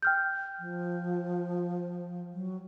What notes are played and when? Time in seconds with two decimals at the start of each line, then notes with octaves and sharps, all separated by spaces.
0.03 G5 F6 G6
0.59 F3
2.33 F#3